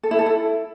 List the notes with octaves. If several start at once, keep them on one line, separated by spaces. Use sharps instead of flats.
A4
E4
A4
E4